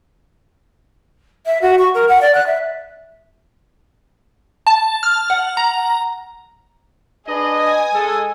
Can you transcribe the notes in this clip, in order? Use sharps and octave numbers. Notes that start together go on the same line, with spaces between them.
E5
F#4
C#6
A#4
F#5
D5
F#6
E5
A5
F6
F#5
A#5
D4 G#4 B4 D#5
G#5 D#6
G#3 A4